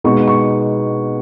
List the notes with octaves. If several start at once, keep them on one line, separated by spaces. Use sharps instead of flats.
B2 G#3 B3 D#4 C#6
C#6